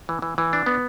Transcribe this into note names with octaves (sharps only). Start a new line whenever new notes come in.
E3
E3
E3
D4
B3